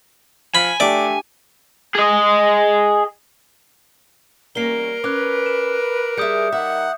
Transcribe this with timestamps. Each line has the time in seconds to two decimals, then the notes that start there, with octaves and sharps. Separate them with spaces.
0.55 F3 G#5 B5
0.80 A3 D4 G4 D5
1.95 G#4 D#5
4.55 E2 G3 A#3 C#4 A#4 C7 G7
5.04 C#4 B4 D6 F#6
5.46 E7
6.17 G3 G#4 E5 D#6 G6 C#7
6.52 G3 D#4 A#4 E5 F#5